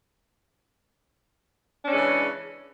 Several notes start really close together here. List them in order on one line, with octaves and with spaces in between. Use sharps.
D4 C#4 G#3 E3 C#3